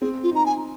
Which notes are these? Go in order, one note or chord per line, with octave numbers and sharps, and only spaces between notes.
C4 G#4
F4
D#4 A#5
G#5